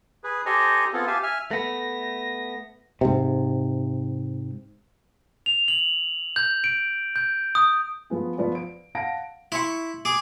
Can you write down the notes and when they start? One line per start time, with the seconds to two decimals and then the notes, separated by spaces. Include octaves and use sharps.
0.24 G#4 B4
0.46 G4 A4 C5 D#5 G#5 A#5
0.93 B3 C4 F4 G#4 A4
1.07 G4 E5 F5 G#5 A5
1.23 E5 G#5 F6
1.51 A3 B3 A#6
3.01 G#2 C3
5.46 F7
5.68 F#7
6.36 G6
6.64 D7
7.16 G6
7.55 D#6
8.10 F3 B3 G#4
8.38 F3 B3 D5
8.55 D7
8.95 F5 F#5 A5 A#6 D7
9.52 E4 C6 C#6
10.05 G#4 D6